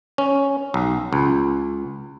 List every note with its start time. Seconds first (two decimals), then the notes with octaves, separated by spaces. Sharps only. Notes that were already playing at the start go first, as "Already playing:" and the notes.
0.18 C#4
0.74 B1
1.13 C#2